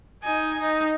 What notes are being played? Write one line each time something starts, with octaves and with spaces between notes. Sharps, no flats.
D#4 G#5
D#4